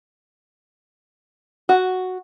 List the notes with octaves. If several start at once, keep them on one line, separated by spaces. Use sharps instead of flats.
F#4